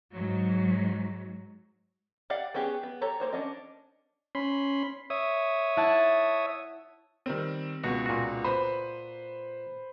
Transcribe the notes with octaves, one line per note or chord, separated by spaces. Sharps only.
G#2 F#3
G4 D5 F5 F#5
B3 C#4 G4 G#4 G5
B3
G4 A4 C#5 A#5
A#3 C5 C#5
C#4 D4 D#5
C#4 B5 C6
C#5 E5 D#6
E4 F#5 A5
D#3 G3 C4
C#2 B2 F#4
A#2 F#4
B4 C5 B5